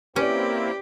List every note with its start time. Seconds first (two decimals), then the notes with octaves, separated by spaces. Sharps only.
0.16 A#3 C4 C#4 E4 G4 B4 D5